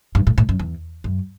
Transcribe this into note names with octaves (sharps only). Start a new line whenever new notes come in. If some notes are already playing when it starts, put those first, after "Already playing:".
G2
A2
A2
F#2
E2
F#2